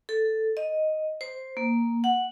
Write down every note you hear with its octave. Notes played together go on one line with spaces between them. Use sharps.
A4
D#5
C5
A#3
F#5